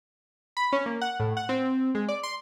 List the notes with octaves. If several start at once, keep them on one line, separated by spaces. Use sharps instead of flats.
B5
C#4
A#3
F#5
A2
F#5
C4
G#3
D5
C6